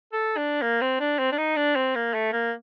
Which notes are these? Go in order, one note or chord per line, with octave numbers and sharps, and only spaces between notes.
A4
D4
A#3
C4
D4
C4
D4
D#4
D4
C4
A#3
A3
A#3